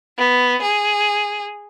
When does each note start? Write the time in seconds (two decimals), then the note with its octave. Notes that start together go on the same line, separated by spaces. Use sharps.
0.18 B3
0.62 G#4